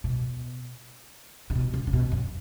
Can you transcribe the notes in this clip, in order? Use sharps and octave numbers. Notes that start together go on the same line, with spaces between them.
B2
C#3
B2
C#3
C#3
B2
F#2